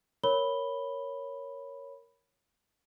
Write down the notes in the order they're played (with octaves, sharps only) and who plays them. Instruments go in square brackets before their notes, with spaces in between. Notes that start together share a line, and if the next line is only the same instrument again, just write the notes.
[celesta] A#4 C#5 B5 G7